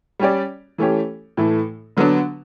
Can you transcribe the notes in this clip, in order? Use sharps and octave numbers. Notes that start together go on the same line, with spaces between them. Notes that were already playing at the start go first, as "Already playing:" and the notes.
G3 C#4 G4 D5
E3 A3 C#4 G4
A2 E3 A3
D3 F#3 B3 D4